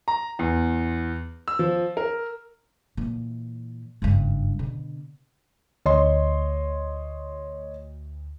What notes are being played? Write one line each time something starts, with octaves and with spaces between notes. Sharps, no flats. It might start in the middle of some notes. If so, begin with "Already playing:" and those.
A#5
E2
E6
F3
A#4
A#2 E3
F#1 G2
B2 D3
D2 C#5 D#5 C6